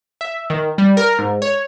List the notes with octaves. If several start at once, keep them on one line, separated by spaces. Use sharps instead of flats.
E5
D#3
G3
A#4
G#2
C#5